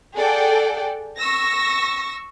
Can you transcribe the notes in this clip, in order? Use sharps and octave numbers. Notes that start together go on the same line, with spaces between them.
G#4 A4 D5 F#5 G5
C#6 E6 A#6